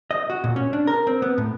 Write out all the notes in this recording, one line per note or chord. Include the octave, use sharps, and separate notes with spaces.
D#5
F#4
A#2
C#4
D4
A#4
C4
B3
A2